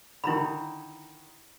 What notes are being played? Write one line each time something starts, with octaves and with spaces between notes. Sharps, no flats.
D3 D#3 E4 A#5 B5